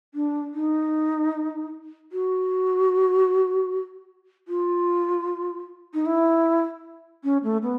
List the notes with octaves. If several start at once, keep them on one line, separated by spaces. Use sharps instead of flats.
D4
D#4
F#4
F4
D#4
E4
C#4
A3
B3